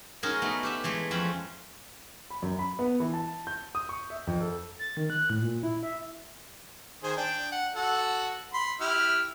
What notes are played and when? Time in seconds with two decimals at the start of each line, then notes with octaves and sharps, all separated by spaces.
0.23 G#3 C#4 D#4 F#4 G#4 A#4
0.42 A3 B3 D#4
0.63 G4 B4 E5
0.84 E3 G#3 A3
1.11 F2 C4 C#4 B5
2.30 B5
2.42 F#2
2.59 B5
2.79 B3
3.00 E3
3.14 A5
3.47 G6
3.75 D#6
3.89 C#6
4.10 E5
4.27 F2
4.41 A4
4.79 A6
4.97 D#3
5.10 F#6
5.30 A2
5.42 A#2
5.63 E4
5.83 E5
7.03 D#3 G#4 C5
7.17 D4 G5
7.52 F#5
7.75 F#4 A4 F#5
8.53 B5 C6
8.81 E4 G4 F6